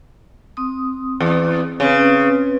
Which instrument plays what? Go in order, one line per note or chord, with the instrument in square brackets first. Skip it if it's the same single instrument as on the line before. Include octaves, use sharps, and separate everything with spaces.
[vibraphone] C4 D#6
[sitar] E2
[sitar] C#3 [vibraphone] C4 C#4 B4